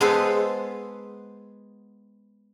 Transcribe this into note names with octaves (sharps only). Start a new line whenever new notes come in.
G#3 B3 G#4 A4 B4 C5